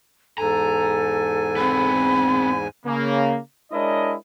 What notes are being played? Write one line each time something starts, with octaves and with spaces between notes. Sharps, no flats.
E2 G#2 A4 G#5 A#5
B3 C4 B5
C#3 A#3
G#3 D4 E4 A#4 C#5 D#5